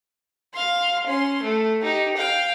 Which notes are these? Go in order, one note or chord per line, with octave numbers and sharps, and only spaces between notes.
F5 C6
C#4 C6
A3
D#4 G4
F5 G5